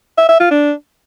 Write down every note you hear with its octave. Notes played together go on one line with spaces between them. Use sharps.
E5
E5
F4
D4